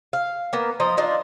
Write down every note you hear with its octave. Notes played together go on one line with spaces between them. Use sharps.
F5
A#3 B3
F3 D#5 A#5
D4 D#4 F4